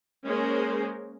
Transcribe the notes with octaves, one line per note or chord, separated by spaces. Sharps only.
G#3 A#3 C#4 G#4 A#4 C5